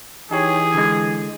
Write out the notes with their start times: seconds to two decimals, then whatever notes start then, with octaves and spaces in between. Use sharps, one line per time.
0.31 E3 D#4 G4 G#4 C#5
0.74 D3 G#3